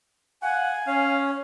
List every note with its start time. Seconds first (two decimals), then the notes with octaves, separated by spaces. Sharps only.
0.43 F5 F#5 G#5
0.87 C#4 C#5 F5